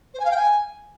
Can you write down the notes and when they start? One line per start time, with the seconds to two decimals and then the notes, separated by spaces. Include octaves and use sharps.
0.14 C5
0.20 G#5
0.25 F5
0.31 G5
0.37 G#5